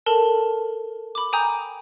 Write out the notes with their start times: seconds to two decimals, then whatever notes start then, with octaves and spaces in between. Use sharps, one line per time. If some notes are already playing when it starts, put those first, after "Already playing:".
0.06 A4 A#4 A5
1.15 B5 D6
1.33 G5 G#5 A#5 D#6 G6